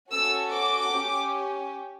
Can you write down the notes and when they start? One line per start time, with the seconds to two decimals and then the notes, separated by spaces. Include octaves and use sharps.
0.12 C#4 F#4 A4 E6
0.52 D6
0.92 C#4 G4